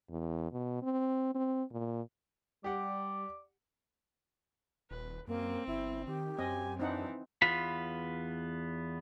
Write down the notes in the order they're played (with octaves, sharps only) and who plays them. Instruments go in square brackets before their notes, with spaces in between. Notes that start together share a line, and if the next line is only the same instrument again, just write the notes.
[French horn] E2
B2
C4
C4
A#2
[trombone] G3 [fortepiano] G4 F#5 [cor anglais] D5
[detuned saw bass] D#1 [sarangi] B4
[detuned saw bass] F#2 [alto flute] A#3 [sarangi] C4
[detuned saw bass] G1 [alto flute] E4
[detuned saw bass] D#3 [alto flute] G4
[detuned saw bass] F#2 [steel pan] C4 D#5 [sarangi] G#5
[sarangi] E3 [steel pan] C4 D#4 F#5 [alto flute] D4
[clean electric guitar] E2 B3 F4 B5